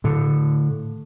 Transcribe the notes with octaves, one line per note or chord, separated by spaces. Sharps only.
A2 D3